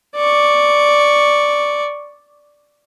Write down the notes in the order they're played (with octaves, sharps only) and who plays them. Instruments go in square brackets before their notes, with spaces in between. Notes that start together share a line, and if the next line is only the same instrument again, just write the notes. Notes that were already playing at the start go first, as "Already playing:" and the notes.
[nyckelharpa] D5 C#6